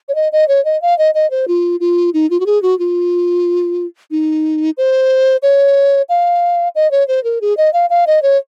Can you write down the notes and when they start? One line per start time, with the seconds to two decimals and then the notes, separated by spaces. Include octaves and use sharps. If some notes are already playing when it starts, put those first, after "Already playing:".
0.09 C#5
0.15 D#5
0.32 D#5
0.48 C#5
0.65 D#5
0.82 F5
0.98 D#5
1.15 D#5
1.31 C5
1.48 F4
1.80 F4
2.14 D#4
2.30 F4
2.40 F#4
2.46 G#4
2.62 F#4
2.79 F4
4.11 D#4
4.77 C5
5.43 C#5
6.09 F5
6.75 D#5
6.91 C#5
7.08 C5
7.24 A#4
7.41 G#4
7.57 D#5
7.73 F5
7.90 F5
8.07 D#5
8.23 C#5